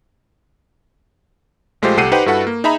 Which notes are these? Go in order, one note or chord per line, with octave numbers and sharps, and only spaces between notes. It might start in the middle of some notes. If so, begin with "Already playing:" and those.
A#1 G#3 A3 F4 G4 C5
C2 G4 A4 F#5 C7 D#7
D#4 G4 B4 C5 F#5 G5
G2 E4 F#4 A4 B4 F#5
A#3
D#4 G#4 E5 A#5 B5